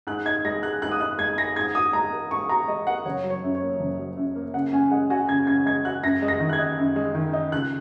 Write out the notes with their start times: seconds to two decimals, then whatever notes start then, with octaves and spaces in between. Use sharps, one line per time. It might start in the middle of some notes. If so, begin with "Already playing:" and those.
0.07 G#2 F#6
0.25 D#4 G#6
0.45 G#3 A#6
0.63 G#4 F#6
0.82 G#2 F#6
0.91 D#6
1.00 D#4 F#6
1.18 G#3 G#6
1.38 G#4 A#6
1.56 G#2 G#6
1.75 F#4 D#6
1.93 G#3 A#5
2.12 A#4
2.31 G#2 C#6
2.49 F#4 A#5
2.68 G#3 D#5
2.87 A#4 F#5
3.05 F#1 C#5
3.23 F#3
3.30 C#5
3.43 F#2
3.55 C#5
3.62 A#3
3.79 F#1
3.99 F#3
4.17 F#2
4.36 A#3
4.54 C#3 F#5
4.73 C#4 G#5
4.91 G#3 F#5
5.10 F#4 G#5
5.29 C#3 G#6
5.47 C#4 G#6
5.65 G#3 G#6
5.85 F#4 F#6
6.03 F#2 A#6
6.22 G#3
6.28 A#6
6.40 D#3
6.49 F#6
6.53 G#6
6.59 D#4
6.77 F#2
6.96 G#3
7.15 D#3
7.33 D#4
7.52 C#2 F#6